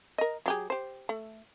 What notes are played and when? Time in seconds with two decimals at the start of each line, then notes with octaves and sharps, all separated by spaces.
0.18 A#4 D#5
0.46 F#3 G4 G#4
0.70 G4 C5
1.09 A3